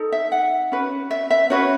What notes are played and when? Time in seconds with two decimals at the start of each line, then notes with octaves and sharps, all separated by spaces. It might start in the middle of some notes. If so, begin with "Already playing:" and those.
Already playing: D#4 A4
0.12 E5
0.32 F#5
0.72 C#4 F#4 B4
1.11 E5
1.30 E5
1.50 C#4 F#4 B4 C#5